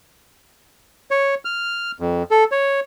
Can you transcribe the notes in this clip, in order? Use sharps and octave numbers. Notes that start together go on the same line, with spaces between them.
C#5
F6
F2
A4
C#5